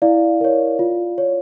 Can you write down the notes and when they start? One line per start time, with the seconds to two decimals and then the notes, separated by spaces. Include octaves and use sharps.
0.02 E4 D5 F5
0.41 A#4 C#5
0.79 F4
1.18 C#5